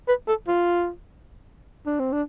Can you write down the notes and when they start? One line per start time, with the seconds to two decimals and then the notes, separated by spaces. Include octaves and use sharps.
0.08 B4
0.28 A4
0.48 F4
1.86 D4
2.00 C4
2.12 D4